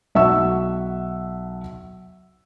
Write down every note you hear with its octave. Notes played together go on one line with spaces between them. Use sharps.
B1 E5 F#5 C#6 E6